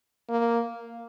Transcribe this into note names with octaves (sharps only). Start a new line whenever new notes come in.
A#3